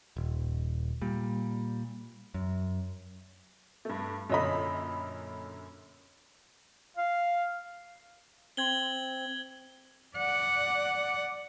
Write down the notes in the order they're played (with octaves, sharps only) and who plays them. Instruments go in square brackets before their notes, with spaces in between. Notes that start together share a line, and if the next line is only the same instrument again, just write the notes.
[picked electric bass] D#1
A#2 G3
F#2
[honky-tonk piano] G2 A3
[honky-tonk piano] F#2 A#2 D3 [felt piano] C#5 D#5 B5
[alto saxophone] F5
[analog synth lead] C4 [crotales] G#6 F#7 G7
[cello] D5 F#5